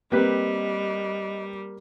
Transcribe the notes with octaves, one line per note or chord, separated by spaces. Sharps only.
G3 A#3 C4 G4 B4 D#5